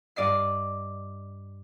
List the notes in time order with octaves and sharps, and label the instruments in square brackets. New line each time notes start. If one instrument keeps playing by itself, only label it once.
[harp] G2 D5 D#5 C7